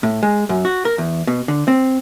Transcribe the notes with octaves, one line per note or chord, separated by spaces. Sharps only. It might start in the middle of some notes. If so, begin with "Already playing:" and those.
A2
G#3
F#2
F#4
A#4
E2
B2
D3
C4